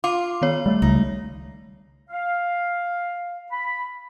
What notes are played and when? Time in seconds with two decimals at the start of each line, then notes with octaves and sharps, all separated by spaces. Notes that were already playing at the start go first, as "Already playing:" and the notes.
0.04 F4 D6
0.42 D#3 B3 C#5
0.66 G3 A3
0.82 C#2 D#4
2.10 F5
3.52 B5